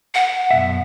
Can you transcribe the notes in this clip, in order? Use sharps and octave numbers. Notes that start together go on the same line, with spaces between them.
F#5
F#2 B2 E5